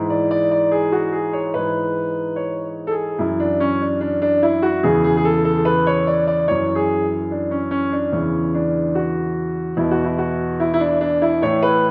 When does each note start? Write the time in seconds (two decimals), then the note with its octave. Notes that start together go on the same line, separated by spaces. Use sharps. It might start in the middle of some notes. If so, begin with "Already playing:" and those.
Already playing: G#2 E3
0.10 D5
0.31 D5
0.51 D5
0.71 G#4
0.92 F#4
1.12 G#4
1.33 C#5
1.54 G#2 E3 B4
2.36 C#5
2.87 A4
2.91 G#4
3.19 F#2 E3 E4
3.40 D4
3.60 C#4
3.81 D4
4.01 D4
4.22 D4
4.43 E4
4.62 F#4
4.83 E2 C#3 E3 G#4
5.04 G#4
5.17 G#4
5.25 A4
5.45 A4
5.65 B4
5.87 C#5
6.07 D5
6.27 D5
6.48 F#2 E3 C#5
6.75 G#4
7.31 D4
7.51 C#4
7.71 C#4
7.92 D4
8.12 E2 C#3 E3 C#4
8.55 D4
8.95 F#4
9.77 E2 B2 E4
9.91 F#4
10.04 E4
10.18 F#4
10.60 E4
10.74 E4
10.80 D4
11.01 D4
11.22 E4
11.42 A2 E3 C#5
11.62 B4